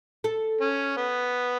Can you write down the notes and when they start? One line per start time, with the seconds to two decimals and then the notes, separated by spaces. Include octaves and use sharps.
0.24 A4
0.61 C#4
0.97 B3